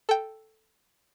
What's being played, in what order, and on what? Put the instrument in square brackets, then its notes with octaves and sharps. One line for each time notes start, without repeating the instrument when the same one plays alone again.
[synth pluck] A4 G5